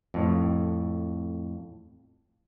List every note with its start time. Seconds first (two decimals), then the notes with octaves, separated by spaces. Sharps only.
0.14 F2 A2